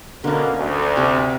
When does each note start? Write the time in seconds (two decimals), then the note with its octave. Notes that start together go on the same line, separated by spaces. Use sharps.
0.24 B2 D3 A#3 C#4
0.57 D2
0.97 C3